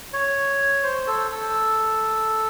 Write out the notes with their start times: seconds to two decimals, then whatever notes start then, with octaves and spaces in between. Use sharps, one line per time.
0.13 C#5
0.83 C5
1.07 A4
1.31 A4